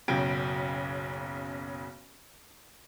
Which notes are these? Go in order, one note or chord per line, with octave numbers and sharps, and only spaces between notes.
F#1 B1 C#3 F#3 G5 D7